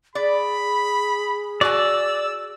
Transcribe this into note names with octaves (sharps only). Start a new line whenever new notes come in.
G#4 D5 B5
F#4 D5 G#5 E6